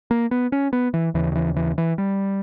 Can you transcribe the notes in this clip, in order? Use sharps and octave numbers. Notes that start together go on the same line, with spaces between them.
A#3
B3
C#4
B3
E3
D#2 C#3 E3
D#3
E3
E3
E3
G3